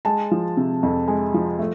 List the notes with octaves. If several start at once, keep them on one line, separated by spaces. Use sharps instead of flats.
G#3 A5
F3
C3
F2
G#3
F3
A3